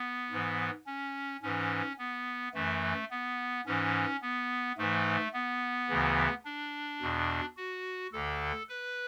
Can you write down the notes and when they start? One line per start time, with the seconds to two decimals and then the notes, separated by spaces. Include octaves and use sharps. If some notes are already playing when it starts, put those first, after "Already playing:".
Already playing: B3
0.31 G#2 E3
0.87 C#4
1.42 G#2 E3 C#4
1.98 B3
2.54 F#2 E3 A3
3.11 B3
3.66 G#2 E3 C#4
4.22 B3
4.78 G#2 E3 A3
5.33 B3
5.89 D2 C#3 E3
6.45 D4
7.01 E2 B2
7.57 F#4
8.13 D2 D3 A4
8.69 B4